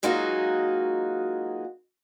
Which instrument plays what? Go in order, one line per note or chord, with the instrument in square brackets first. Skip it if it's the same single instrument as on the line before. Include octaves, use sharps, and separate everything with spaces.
[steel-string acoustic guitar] F#3 G#3 A#3 D#4 F4 F#4